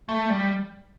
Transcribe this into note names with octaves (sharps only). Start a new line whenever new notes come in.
A3
G3